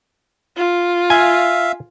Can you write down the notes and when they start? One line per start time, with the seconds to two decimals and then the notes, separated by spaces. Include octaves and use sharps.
0.57 F4
1.10 E5 F5 G#5